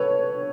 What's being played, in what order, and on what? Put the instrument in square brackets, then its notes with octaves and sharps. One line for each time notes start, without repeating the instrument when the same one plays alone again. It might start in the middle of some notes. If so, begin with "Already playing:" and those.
Already playing: [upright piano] A4 B4 C#5